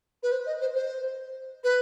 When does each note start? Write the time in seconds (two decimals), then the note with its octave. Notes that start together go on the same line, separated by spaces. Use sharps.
0.23 B4
0.32 C5
0.46 D#5
0.61 C5
0.75 C5
1.64 B4